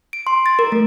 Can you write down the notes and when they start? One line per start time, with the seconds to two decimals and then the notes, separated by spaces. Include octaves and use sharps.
0.13 D7
0.27 C6
0.46 A6
0.59 A#4
0.72 A3